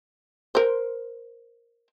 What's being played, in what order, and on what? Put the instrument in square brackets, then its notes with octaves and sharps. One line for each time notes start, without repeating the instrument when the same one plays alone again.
[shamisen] A#4 C5